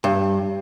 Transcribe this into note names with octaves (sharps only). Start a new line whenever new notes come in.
G2